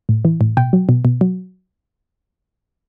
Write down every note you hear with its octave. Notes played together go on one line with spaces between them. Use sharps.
A2
E3
A2
B2 G5
F#3
B2
B2
F#3